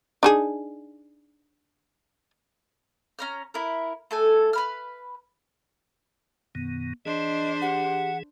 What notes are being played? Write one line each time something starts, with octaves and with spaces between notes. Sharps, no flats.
D4 D#4 G#4
C#4 A#5 F6
E4 A#4
A3 A4 G#5
B4 B5 F6
F#2 B2 D#3 B3
E3 D4 G#4 C5 D#5
G4 F#5